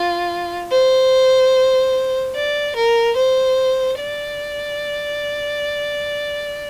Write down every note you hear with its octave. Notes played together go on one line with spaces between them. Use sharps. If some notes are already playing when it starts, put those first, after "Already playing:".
Already playing: F4
C5
D5
A#4
C5
D5